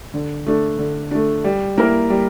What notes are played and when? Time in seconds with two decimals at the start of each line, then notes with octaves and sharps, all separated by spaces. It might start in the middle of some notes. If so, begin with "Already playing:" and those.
0.14 D3
0.46 A3 D4
0.79 D3
1.11 A3 D4
1.44 G3
1.78 A#3 E4 A#4
2.10 G3